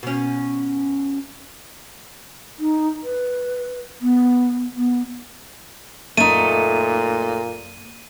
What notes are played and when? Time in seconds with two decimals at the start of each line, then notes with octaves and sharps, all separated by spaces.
0.03 B2 C#4
2.59 D#4
3.03 B4
4.01 B3
4.77 B3
6.17 F#2 A#2 A3 A#3 D#4 D#7